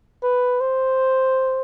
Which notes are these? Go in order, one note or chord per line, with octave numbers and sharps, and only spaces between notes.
B4
C5